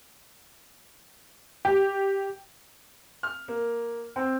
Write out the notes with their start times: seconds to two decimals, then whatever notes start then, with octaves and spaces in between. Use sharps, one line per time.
1.65 G4
3.23 F6
3.48 A#3
4.16 C4